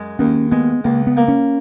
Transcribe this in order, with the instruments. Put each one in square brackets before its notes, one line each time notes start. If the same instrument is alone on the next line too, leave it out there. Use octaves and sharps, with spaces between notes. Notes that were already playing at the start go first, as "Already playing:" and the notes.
Already playing: [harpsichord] F#2 G#3
[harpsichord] D#2 [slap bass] C#4
[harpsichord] G#3 [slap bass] B3
[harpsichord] C#2 [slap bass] A#3
[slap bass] B3
[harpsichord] A#3
[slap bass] C#4